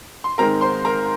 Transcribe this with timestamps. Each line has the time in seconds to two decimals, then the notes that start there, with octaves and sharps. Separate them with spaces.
0.24 C6
0.38 G#2 D#3 G#3 C4 A#4 A#5
0.61 C5 C6
0.85 A#4 A#5